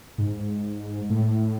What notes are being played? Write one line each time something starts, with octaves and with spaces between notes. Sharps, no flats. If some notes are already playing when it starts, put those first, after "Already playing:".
G#2
A2